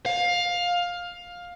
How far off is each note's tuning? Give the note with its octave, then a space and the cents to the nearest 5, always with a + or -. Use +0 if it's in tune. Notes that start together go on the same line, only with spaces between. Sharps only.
F5 +15